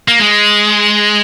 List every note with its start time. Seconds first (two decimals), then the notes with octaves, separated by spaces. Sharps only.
0.08 A#3
0.20 G#3